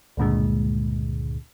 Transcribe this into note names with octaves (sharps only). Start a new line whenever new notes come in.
C#2 G2 A#2 D3 G#3